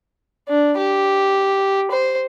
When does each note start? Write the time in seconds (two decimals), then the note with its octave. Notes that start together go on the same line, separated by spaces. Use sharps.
0.48 D4
0.77 G4
1.91 C5